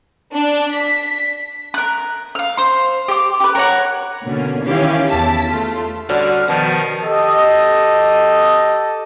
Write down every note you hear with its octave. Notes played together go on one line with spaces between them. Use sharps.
D4
B6
A#4 F#6
F5 F6
C5 C6
G4 D6
G4 B4
A#4 C#5 F#5
B2 D3 A#3 C#4
D#3 E3 C#4 E4 G4 F5
E2 E4 A5 B6
A3 F4
D3 G3 C#4 F#4 F6
B2 D#3 F3 B3 A5
G4 A4 D#5